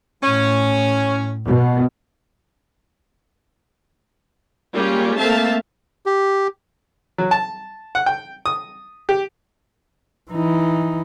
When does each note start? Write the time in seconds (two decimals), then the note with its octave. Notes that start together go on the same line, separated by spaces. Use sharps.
0.23 A2 C#4
1.45 B2
4.73 G3 G#3 A#3 C#4 F4 G4
5.18 A3 A#3 C4 E5 F5 A5
6.06 G4
7.18 F#3
7.31 A5
7.95 F#5
8.06 G5
8.46 D#6
9.09 G4
10.31 E3 D#4